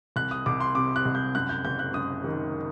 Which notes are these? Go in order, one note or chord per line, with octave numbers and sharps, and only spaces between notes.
C2 F#6
D#6
C2 D6
C6
C3 D6
F#6
C2
G6
F#2 F#6
G6
F#1 G6
F#6
F#2 D#6
D#3